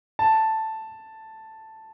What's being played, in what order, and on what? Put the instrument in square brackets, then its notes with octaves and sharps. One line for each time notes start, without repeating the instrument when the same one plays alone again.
[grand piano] A5